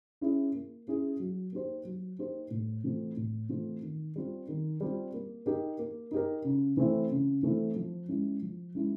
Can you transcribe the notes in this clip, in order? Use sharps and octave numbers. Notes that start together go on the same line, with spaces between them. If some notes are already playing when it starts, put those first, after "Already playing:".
C#4 E4 G#4
A#3
C#4 E4 G#4
F#3
A#3 D#4 G4 C5
F#3
A#3 D#4 G4 C5
A2
E3 A3 C4 F4
A2
E3 A3 C4 F4
D#3
G3 C4 F4
D#3
G3 C4 F4
A#3
D#4 G4 A#4
A#3
D#4 G4 A#4
C#3
E3 A3 C4 E4
C#3
E3 A3 C4 E4
F3
G#3 C#4 E4
F3
G#3 C#4 E4